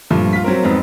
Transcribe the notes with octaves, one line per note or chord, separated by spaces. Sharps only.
G2 A#2 F3 A3
F4 B6
F#3 C4 A#4
F2 G#2 B3 C4